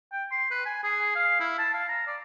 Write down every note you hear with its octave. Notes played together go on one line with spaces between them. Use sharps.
G5
C6
B4
G#5
G#4
F5
E4
A5
F5
A#5
D5